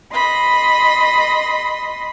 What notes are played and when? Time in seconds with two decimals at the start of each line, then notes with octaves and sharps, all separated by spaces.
0.13 D#5 B5 C6